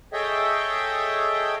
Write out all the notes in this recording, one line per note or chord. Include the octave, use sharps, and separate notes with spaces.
G#4 A4 C#5 D#5 E5 G5